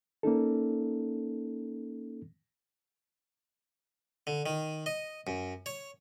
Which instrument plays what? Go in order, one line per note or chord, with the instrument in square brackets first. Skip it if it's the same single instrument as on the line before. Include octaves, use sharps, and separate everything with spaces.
[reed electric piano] A#3 C#4 D#4 A4
[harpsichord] D3
D#3
D#5
F#2
C#5